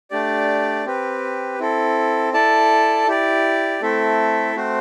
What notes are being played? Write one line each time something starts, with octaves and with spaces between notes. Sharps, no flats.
A3 D4 G4 D5
C4 G4 B4
C4 E4 A4
E4 A4 D5 A5
E4 G4 D5
A3 C4 E4 A4 E5
A3 C4 F#4 C5